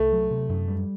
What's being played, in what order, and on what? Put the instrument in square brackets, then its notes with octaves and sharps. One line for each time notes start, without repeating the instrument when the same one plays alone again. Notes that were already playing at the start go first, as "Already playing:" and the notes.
Already playing: [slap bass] C2 [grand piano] A3
[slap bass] F#3
C3
F#2
G3